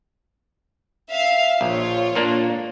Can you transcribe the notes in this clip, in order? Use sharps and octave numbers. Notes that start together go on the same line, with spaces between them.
E5 F5
A#1 F4 C#5
A#2 A#3 D4